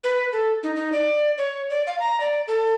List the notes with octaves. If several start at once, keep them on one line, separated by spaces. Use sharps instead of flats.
B4
A4
D#4
D#4
D5
C#5
D5
F5
A#5
D5
A4